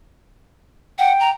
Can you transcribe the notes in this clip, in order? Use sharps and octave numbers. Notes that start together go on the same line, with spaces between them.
F#5 G5
A#5